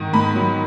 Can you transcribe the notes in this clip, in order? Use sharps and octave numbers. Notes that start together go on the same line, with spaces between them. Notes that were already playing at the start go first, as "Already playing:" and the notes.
Already playing: G#2 D#3
G#2 B5
F#3